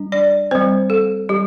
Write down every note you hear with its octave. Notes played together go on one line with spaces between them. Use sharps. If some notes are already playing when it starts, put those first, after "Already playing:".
Already playing: G3 D4
D5
G3 C4 C5
A4
G3 G4